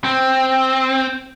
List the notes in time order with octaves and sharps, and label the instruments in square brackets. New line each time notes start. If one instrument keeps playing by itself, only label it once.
[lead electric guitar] C4